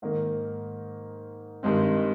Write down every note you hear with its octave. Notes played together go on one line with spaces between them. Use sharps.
G#2 D#3 A#3
G2 D#3 G#3 C4